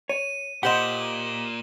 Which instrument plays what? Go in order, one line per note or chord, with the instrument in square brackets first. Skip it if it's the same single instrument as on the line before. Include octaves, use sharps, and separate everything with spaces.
[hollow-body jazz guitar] C#5 [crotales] D#7
[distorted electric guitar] A#2 [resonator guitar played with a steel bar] G4 C5 D#5 [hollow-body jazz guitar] F#5 [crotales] E7 F#7 G7